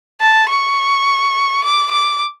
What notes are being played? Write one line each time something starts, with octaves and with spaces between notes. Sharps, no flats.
A5
C#6
D6
D6